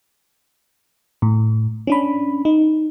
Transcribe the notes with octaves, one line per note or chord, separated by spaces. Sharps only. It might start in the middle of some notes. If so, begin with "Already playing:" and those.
A2
C#4 D4 B5
D#4